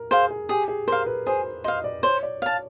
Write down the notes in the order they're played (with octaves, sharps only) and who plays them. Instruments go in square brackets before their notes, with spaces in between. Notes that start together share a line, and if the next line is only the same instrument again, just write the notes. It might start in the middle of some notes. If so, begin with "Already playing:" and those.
Already playing: [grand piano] A#4
[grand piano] G#4 [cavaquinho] C5 F5
[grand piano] G#4
[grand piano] G4 [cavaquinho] G#4
[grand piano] G#4
[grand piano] A#4 [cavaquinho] C5 F5
[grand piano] B4
[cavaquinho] G#4 [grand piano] C5
[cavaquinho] C5 F5 [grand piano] D#5
[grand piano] D5
[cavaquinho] C5 [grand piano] C#5
[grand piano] D5
[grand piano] C#5 [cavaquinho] F5 A5